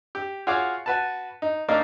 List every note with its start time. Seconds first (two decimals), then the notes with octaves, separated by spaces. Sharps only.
0.15 G4
0.47 F4 F#4 G#4 C#5 F5 D6
0.86 F#4 B4 A5
1.42 D#4
1.68 A2 A#3 D4 D#4 F5